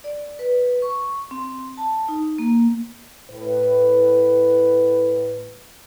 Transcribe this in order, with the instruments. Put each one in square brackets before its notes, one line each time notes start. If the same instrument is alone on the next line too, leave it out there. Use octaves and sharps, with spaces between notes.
[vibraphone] D5
B4
C#6
C4
A5
D#4
A#3
[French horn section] A2 B4